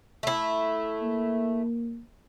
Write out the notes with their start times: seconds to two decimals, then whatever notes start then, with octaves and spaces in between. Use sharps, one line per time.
0.23 A3 E4
1.03 A#3